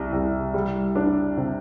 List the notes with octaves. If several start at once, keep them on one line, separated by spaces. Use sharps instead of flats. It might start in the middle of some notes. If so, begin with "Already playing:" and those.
Already playing: C2 G3
C2
G3
D4
C3